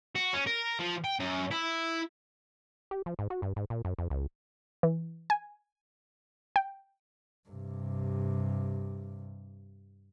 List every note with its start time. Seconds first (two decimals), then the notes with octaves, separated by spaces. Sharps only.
0.16 F#4
0.34 C#4
0.47 A#4
0.80 F3
1.04 G5
1.20 F#2
1.51 E4
2.91 G4
3.06 F3
3.19 G#2
3.30 F#4
3.42 G2
3.56 G#2
3.70 A#2
3.85 F#2
3.98 F2
4.10 C#2
4.83 E3
5.30 G#5
6.56 G5
7.49 G2 C3